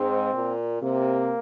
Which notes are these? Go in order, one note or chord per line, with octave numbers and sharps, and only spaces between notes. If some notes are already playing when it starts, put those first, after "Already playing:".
Already playing: G#2 C4
A#2
C3 A#3